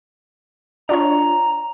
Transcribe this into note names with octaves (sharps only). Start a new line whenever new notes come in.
D4 F4 C#5 A#5